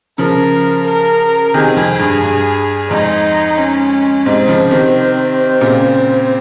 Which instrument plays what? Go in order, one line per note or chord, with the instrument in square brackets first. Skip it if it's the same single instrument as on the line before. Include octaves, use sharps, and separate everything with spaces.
[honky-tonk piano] C#3 F3 [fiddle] A#4
[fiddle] A#4
[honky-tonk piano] C3 D#3 [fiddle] G#4
[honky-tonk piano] F2
G2
G2
[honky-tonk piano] F2 G#2 [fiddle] D#4
[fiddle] C#4
[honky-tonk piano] G#2 C3 [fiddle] C4
[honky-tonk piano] C#3 F3
C3 D#3
A#2 C#3